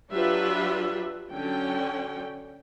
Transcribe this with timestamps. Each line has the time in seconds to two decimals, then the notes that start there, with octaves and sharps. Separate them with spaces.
0.12 F#3 D4 F4 G4 B4 E5
1.32 D3 F#3 C#4 G5